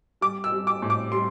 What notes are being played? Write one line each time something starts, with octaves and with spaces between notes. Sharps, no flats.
G3 D6
E6
G3
D6
A2
D6
G3 C6